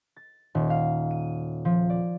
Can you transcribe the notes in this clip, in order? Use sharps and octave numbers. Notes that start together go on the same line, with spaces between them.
A6
D#1
F5
D#7
F3
D5